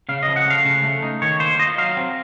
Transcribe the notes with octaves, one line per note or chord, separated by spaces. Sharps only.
C#3 F5
D#5
F3
F#5
A3 F5
C#3
A3
D#4
D#3 C#5
A#3 C5
F4 D#5
F#3 F5
C4